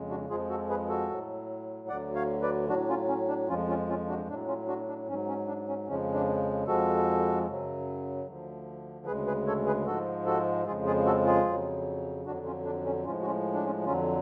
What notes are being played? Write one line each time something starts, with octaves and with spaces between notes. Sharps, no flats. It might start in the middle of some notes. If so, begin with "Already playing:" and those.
Already playing: F2 C#3 G#3
D4 F#4
F2 F3 G#3 F4 G#4
F#4 A4
G#4 B4
F#4 A4
A2 F#3
D2 D3 F#3 D5 F#5
C#5 F5
B4 D5
A2 F#3 D4 F#4
C#4 F4
C#4
D4
F2 F3 G#3 C#4 F4
C#4 F4
C#4 F4
D4 F#4
A2 F#3 D4
C#4 F4
D4 F#4
D4
G#2 F#3 C#4
C#4
D4
C#4
F2 C#3 F3 G#3 C#4
D4
F2 F3 G#3 F#4 A4
F#2 C#3 F#3
D2 D3 F3
D2 C#3 G#3 G#4 B4
G#4 B4
A4 C#5
G#4 B4
G#2 F3 G#3 F#4 A4
F#4 A4
F2 C#3 F3 G#3 F4 G#4
F4 G#4
F#4 A4
F4 G#4
F2 C#3 F#3
F2 D3 F#3 D4 F#4
C#4 F4
D4
C#4
A2 F3 G#3 C#4 F4
F#4
C#4 F4
D4
C#4 F4
F2 D3 F#3 C#4 F4